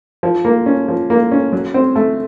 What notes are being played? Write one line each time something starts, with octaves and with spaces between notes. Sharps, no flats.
F3
A#3
C#4
F3
A#3
C#4
F#3
C4
A3